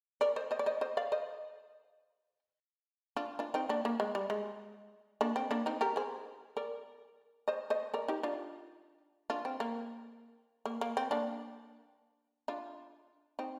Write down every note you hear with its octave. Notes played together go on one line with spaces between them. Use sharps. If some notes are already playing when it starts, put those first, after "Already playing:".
A#4 D5
C5 D#5
C5 D#5
D5
C5 D#5
C5 D#5
D5 F5
C5 D#5
D4 F4
D4 F4
C4 D#4
A#3 D4
A#3
G#3
G3
G#3
A#3 D4
C4
A#3 D4
C4 D#4
G4 A#4
G#4 C5
A#4 D5
C5 D#5
C5 D#5
A#4 D5
D#4 G4
D4 F4
D4 F4
C4
A#3
A#3
A#3
C4
A#3 D4
D4 F4
C4 D#4